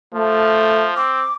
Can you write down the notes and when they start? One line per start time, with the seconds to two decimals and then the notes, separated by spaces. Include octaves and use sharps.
0.14 F3 A3
0.96 C4 D6